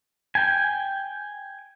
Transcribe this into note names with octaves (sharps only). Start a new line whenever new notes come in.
G5 G#5